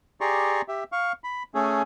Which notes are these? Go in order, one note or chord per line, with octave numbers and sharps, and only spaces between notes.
G4 G#4 D5 A#5 C6 C#6
G4 E5
F5 C#6
B5
A3 C#4 G#4 A4